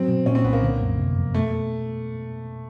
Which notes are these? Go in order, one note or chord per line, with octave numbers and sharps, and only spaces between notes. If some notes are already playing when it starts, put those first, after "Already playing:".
Already playing: F#3 C4
B2
A#2 C#4
C4
C2 B3
A#3
D3
F#2
C3
F2
B2 A3